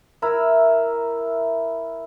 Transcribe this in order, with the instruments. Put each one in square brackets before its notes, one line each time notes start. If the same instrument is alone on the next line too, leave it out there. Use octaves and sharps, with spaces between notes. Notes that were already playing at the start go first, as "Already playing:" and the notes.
[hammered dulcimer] E4 A#4 E5